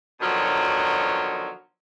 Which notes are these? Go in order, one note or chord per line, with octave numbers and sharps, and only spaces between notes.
B2 D3 D#3 F3 F#3